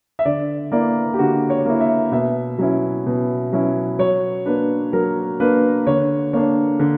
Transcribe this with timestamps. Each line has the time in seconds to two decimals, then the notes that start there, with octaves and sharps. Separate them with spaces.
0.19 E5
0.25 D3 D5
0.72 A#3 E4 D5
1.14 G4
1.19 D3 F#4
1.50 C#5
1.66 A#3 E4
1.80 E5
2.12 B2 E5
2.58 F#3 C#4 E4
3.06 B2
3.53 F#3 C#4 E4
3.99 F#3 C#5
4.46 A#3 D4 B4
4.93 F#3 A#4
5.40 A#3 D4 B4
5.87 D3 C#5
6.33 A#3 D4 C#5
6.79 D3